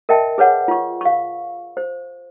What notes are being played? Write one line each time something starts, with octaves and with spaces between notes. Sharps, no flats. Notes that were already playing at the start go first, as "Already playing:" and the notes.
A#4 D#5 E5 G5 A5
G#4 B4 C#5 F#5
F4 C#6
F5 C#6
C5